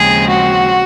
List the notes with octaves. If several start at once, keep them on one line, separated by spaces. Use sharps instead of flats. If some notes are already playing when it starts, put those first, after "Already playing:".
Already playing: D#2 C#3 F3 G#3 C4 G#4
F#4